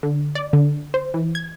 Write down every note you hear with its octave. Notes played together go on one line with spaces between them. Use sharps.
D3
D5
D3
C5
E3
G#6